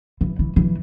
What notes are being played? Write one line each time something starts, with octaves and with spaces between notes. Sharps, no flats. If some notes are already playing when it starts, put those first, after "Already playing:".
E3
E3
E3